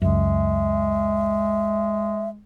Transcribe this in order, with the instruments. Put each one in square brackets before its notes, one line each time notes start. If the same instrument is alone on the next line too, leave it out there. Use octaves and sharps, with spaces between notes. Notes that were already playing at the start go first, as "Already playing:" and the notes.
[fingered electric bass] C#2 F#2 [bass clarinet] G#3 [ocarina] E5